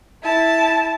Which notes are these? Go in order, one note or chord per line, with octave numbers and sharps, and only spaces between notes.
E4 A5